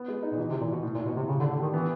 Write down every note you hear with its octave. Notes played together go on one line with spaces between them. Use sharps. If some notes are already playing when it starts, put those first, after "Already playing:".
Already playing: B3
G#3
D#4
A#2
B2 E3
C3
E3
A#2
B2 E3
A2
A#2
A2
B2
A2 C3
C#3 G4
D3
D4
D3
D#3 G4
E3 B3